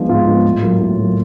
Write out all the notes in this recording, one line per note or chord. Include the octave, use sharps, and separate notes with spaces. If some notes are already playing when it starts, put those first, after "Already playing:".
Already playing: F3 G#3 B3 D4
G#2 F4
F3 G#3 B3 D4
A2
F#3 A#3
A2
F#3 A#3